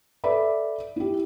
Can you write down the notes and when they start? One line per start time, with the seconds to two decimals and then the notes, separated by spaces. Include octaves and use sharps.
0.24 A4 B4 D5 E5 B5
0.96 E4 G4